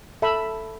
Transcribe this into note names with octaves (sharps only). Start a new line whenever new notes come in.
A4 E5 B5